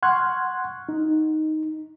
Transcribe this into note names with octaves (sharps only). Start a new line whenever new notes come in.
F#5 C6 C#6 F6 F#6 G#6
D#4